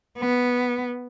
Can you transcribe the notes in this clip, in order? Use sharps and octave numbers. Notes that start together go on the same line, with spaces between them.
B3